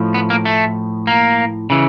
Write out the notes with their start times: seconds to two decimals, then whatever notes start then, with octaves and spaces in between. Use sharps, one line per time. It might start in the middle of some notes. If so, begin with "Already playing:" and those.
Already playing: A2 F3
0.14 B3
0.30 A#3
0.45 A3
1.07 A#3
1.70 C#3 E3